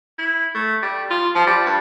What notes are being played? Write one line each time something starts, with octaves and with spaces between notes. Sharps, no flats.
E4
A3
G3
F4
F3
G3
G2